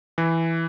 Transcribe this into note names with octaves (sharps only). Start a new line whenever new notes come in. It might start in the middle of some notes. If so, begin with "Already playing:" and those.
E3